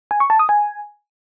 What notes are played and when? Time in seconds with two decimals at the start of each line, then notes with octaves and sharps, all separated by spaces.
0.11 G#5
0.20 C#6
0.30 A5
0.39 D#6
0.49 G#5